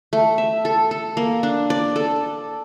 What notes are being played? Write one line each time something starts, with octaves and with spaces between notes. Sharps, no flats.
A3
E5
A4
A4
A#3
D4
D5
A4